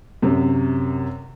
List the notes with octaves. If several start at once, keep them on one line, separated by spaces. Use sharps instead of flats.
F#2 C3